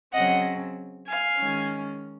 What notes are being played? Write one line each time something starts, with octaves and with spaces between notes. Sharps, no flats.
C#3 F#3 C4 D#5 F#5
F5 G#5
D#3 G#3 C#4